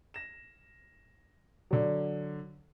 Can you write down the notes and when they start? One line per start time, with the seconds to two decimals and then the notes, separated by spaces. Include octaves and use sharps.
0.14 A#6 E7
1.71 D3 F#3